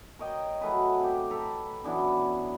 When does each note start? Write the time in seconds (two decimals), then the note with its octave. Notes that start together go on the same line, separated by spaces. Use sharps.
0.19 A#4 C#5 D#5 G5
0.61 F#3 A3 G#4 B4
0.99 C4 G4
1.31 A4 B4 A#5 B5
1.84 F#2 E3 B3 D4